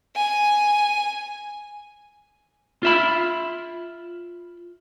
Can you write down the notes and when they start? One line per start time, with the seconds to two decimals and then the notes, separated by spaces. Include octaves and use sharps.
0.16 G#5
2.83 F4 E5 B5